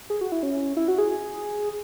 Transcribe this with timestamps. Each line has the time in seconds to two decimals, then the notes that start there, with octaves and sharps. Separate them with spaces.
0.10 G#4
0.21 F#4
0.32 E4
0.43 C#4
0.77 E4
0.88 F#4
0.98 G#4